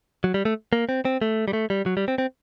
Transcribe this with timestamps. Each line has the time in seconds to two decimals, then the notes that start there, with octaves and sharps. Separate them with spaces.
0.24 F#3
0.34 G3
0.45 A3
0.73 A#3
0.89 C4
1.05 C4
1.22 A3
1.48 G3
1.53 A3
1.70 G3
1.86 F#3
1.97 G3
2.08 C4
2.18 C4